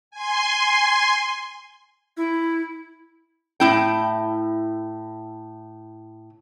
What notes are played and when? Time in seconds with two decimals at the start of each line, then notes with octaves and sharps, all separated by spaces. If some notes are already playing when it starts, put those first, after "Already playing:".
0.11 G#5 C6
2.17 E4
3.60 A2 E4 G5